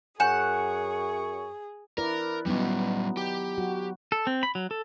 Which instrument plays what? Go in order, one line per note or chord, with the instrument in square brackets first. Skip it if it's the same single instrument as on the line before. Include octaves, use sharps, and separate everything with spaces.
[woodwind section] F#2 C#6 [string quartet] G#4 [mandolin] F#5 [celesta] G#5 G6 E7
[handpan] E4 B4 D5 [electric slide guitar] A#4
[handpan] F#3 B3 D#4 [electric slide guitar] G3 C#4
[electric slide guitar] G4
[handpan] F#3 F#4
[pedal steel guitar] A4
C4
B5
F#3
A4